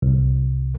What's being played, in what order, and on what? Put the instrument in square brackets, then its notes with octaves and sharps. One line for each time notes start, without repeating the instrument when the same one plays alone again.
[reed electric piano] C2